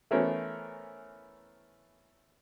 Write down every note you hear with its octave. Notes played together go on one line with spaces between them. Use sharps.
E3 A3 B3 C#4 A#4 C5